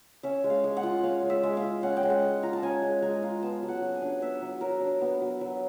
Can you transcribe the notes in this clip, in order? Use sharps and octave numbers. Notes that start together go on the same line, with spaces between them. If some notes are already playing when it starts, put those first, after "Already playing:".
C#4 E5
G#3
F5
G#3
F#5
F4
C#4 F5
G#3
E5
G#3
F5
F4
C#4 F#5
G5
G#3
F#5
G#3
F4 A#5
A5
C#4 G#5
G#3
G#3 A#5
F4
B3 A5
F#3
F#5
F#3
G#5
D4
B3 E5
F#3
F#3 A#4
D4
B3
F#3
F#3